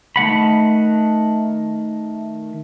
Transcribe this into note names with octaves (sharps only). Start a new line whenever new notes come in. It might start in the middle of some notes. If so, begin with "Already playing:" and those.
D#3 A3 F#5 B5